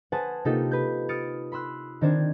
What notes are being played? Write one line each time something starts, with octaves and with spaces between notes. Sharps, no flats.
B4 C5 F#5 G#5 A5 D#6
C3 A#3 D#4 F4 G4 A4
B4 G6
D#6 F6 A6 C#7 D7
B5 C6 E6 F#6
D#3 C4 D4 C5 G#6